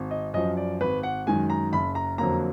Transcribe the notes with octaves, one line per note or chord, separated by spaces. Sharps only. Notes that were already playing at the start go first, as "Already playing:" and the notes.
Already playing: G#1
D#5
F#2 F3 D#5
D5
G#1 B4
F#5
F#2 D#3 G#3 G#5
A#5
F#1 B5
A#5
F2 D3 F#3 A#3 A#5